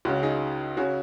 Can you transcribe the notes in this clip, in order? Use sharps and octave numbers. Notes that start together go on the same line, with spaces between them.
C#2 C#3 C#4 F#4
D#4 G#4
C#3 C#4 F#4